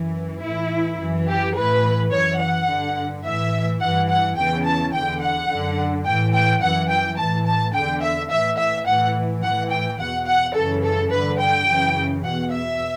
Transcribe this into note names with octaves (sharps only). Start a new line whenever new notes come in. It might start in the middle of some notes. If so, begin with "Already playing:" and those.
Already playing: F#2 E3
A2 E3 E4
F#2 E3
G4
A2 E3 B4
F#2 E3 C#5
F#5
G2 D3
A2 E3 E5
G2 E3 F#5
F#5
E2 C#3 E3 G5
A5
E2 D3 G5
F#5
F#2 D3
A2 E3 G5
G5
F#2 E3 F#5
G5
A2 E3 A5
A5
E2 D3 G5
E5
A2 E3 E5
E5
A2 E3 F#5
A2 E3 F#5
G5
E2 B2 F#5
F#5
F#2 C#3 E3 A4
A4
G2 D3 B4
G5
F#2 C#3 E3
E2 B2 F#5
E5